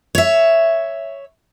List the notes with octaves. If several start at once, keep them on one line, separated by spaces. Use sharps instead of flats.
C#5 E5